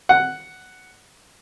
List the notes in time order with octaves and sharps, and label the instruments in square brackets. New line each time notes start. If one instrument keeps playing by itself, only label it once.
[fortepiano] F#5